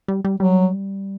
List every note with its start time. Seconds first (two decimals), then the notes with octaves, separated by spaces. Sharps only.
0.08 G3
0.25 G3
0.40 F#3 G3